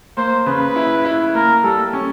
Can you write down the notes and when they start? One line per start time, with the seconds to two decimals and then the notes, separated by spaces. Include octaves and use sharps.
0.17 A#3 C5
0.46 C#3 B4
0.76 E4
1.05 E4
1.35 A#3 A#4
1.63 G3 A4
1.93 C#4